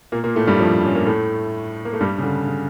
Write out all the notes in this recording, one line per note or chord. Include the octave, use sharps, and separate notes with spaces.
A#2 A#3
A#2 A#3
A2 A3
G2 G3
F2 F3
C#4
A#3
A2 A3
A#3
A3
G2 G3
C#3
D3
C#3